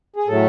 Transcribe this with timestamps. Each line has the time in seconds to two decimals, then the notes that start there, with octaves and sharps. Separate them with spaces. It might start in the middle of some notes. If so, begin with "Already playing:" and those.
0.16 G#4
0.28 A2 F#3 A3 A4